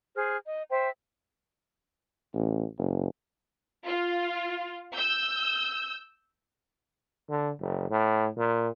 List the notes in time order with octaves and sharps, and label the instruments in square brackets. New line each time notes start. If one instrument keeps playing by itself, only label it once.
[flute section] G#4 C5 F6
D#5
C5 E5 G5
[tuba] A1
F#1
[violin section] F4
E6 G6
[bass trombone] D3
F#1
A2
A#2